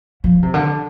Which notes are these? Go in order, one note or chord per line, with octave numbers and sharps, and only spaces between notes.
F3
C3
D3